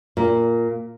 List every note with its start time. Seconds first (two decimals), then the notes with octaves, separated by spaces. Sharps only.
0.17 A#2